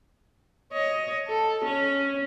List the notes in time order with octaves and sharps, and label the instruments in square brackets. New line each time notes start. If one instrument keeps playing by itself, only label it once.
[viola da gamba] C#5 D#5
A4
C#4